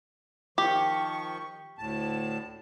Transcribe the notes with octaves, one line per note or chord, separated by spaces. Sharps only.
D#3 F3 G4 C#6
D2 A2 A5